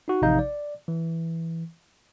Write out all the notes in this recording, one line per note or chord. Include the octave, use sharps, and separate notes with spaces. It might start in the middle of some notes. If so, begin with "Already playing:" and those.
D#4 F#4
A1 C3 F3 D#4 F5 G6
D5
E3